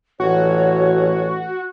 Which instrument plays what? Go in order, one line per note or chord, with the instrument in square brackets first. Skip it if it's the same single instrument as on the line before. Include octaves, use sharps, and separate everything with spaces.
[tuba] A1 [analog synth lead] F#4 [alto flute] C#5